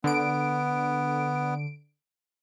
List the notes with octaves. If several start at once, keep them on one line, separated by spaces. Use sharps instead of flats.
D3 B3 D7